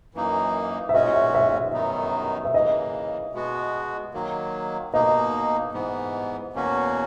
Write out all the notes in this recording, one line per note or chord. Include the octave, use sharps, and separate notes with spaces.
F#2 E3 A#3 D#4
E5
A#2 G#3 C#4 F#4 D#5
E5
E5
E5
F#2 D#3 F#3 B3 D#4
E5
C#3 E3 A#3 D#5
B2 G#3 B3 F#4
D#3 F#3 A#3
B2 A#3 D#4 D#5
G#2 E3 B3
E2 B2 A#3 C#4 F#4